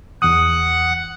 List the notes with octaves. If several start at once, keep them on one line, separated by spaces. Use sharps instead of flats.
E2 F#5 D#6